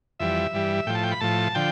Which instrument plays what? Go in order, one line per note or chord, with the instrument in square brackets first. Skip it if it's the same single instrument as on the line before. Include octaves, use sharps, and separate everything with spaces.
[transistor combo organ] F2 E3 G3 E5
G2 E3 G3
A2 F3 G5
A5
G5
B5
A2 F3 A5
D3 F3 G5